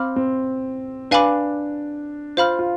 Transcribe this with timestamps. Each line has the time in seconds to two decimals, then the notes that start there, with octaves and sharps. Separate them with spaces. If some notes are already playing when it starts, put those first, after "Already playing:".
Already playing: C4 F5 B5 D6 F6
0.16 C4
1.11 D4 B4 F5 G#5 B5 D6
2.37 F4 C5 F5 B5 F6
2.59 F4